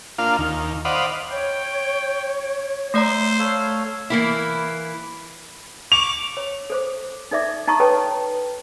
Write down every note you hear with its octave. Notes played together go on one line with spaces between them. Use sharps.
A#3 D4 F4 F5
D#2
C5 D5 D#5 F5 F#5 B5
C#5 G5
A3 C5 D5 E5 A#5
A4 C#5 F5
E3 A#3 E4
C#6 D6 F7
C#5
A4 C5 D6
D#4 A4 D5 E5 D6
D#4 A5 A#5 C#6 D#6
A4 B4 C#5 G5 A5